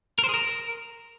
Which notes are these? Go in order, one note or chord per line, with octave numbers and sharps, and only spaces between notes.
A#4
C5
G#4
A#4